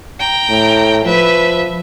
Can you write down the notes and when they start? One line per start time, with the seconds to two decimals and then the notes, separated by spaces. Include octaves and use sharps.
0.20 G5 A#5
0.50 A2
1.05 F3 B4 E5